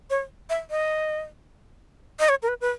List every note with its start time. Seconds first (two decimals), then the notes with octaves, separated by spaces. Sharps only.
0.10 C#5
0.50 E5
0.70 D#5
2.19 D#5
2.29 C#5
2.43 A#4
2.48 B4
2.61 B4